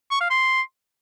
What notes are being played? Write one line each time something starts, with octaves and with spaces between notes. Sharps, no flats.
C#6
F5
C6